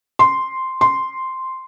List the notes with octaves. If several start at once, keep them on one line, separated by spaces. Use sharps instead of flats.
C6
C6